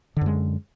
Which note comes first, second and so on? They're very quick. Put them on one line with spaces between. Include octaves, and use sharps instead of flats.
D3 F#2 G#3